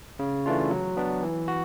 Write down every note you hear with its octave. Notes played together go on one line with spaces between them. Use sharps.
C#3
E3 A3 D4 F4
F#3
B3 D4
E3
F#4